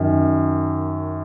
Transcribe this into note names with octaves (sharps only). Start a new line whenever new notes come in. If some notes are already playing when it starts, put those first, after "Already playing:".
Already playing: F#2 D#3